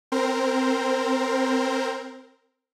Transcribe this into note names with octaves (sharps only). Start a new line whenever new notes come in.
C4 A#4 C5